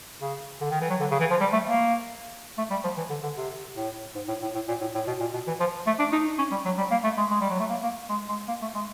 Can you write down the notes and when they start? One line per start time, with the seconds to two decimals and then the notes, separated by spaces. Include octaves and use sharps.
0.21 C#3
0.61 D3
0.71 D#3
0.81 E3
0.90 F#3
1.00 D3
1.11 C#3
1.20 E3
1.30 F3
1.40 G3
1.53 A3
1.66 A#3
2.58 A3
2.70 G3
2.84 F3
2.97 E3
3.10 D3
3.23 D3
3.36 C3
3.76 A2
4.15 G#2
4.28 A2
4.42 A2
4.55 A2
4.68 A#2
4.81 A2
4.94 A2
5.07 B2
5.20 A#2
5.34 B2
5.47 E3
5.60 F3
5.86 A3
5.99 D4
6.12 D#4
6.38 C#4
6.51 G3
6.65 F#3
6.78 G3
6.91 A#3
7.04 A3
7.17 G#3
7.31 G#3
7.41 G3
7.50 F#3
7.60 A3
7.70 A#3
7.83 A#3
8.09 G#3
8.29 G#3
8.48 A#3
8.62 A3
8.75 G#3